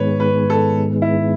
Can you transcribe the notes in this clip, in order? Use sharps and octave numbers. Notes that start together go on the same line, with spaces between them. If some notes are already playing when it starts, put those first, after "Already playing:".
Already playing: G#2 D#3 G#3 B3 B4 C#5
B4
A4
E4